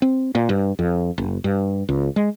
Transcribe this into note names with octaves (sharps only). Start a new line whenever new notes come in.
C4
A#2
G2
F2
F#1
G2
C#2
G#3